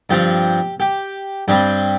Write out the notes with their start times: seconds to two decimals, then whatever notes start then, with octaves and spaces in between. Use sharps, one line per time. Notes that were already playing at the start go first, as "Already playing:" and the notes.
0.10 G2 F3 C4 G4
0.80 G4
1.48 G2 G3 C4 G4